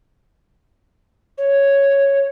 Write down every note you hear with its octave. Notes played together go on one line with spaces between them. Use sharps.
C#5